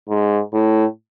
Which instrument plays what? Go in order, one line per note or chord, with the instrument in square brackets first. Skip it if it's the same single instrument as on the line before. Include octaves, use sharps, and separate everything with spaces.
[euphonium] G#2
A2